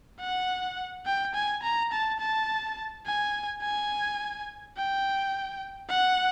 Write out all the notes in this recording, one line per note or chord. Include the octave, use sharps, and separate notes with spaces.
F#5
G5
G#5
A#5
A5
A5
G#5
G#5
G5
F#5